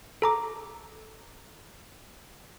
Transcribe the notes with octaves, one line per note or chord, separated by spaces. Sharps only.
A4 A#5 D6